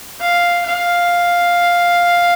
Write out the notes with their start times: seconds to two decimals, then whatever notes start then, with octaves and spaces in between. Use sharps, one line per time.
0.20 F5
0.66 F5